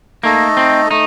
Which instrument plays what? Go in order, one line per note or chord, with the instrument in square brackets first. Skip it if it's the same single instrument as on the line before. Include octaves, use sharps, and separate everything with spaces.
[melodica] A3 D#4 A4 D#5 [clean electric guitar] A#3
[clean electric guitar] C4
[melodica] A3 [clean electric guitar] D#4